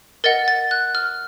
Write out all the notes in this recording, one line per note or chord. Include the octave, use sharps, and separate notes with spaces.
A#4 D#5 F#5 A6
A6
F#6
F6